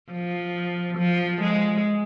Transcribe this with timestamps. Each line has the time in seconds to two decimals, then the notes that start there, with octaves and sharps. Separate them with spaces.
0.12 F3
0.98 F3
1.42 G#3